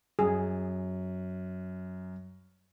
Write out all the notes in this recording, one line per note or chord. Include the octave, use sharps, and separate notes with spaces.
F#2 G#4